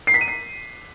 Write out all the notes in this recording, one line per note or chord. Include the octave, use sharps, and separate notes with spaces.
C7
B6
D#7
C7